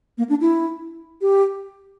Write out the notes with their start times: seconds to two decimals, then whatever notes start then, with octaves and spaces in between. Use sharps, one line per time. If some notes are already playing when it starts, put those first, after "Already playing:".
0.18 A#3
0.29 D4
0.41 E4
1.22 G4